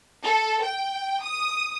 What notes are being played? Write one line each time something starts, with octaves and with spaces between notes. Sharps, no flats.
A4
G5
D#6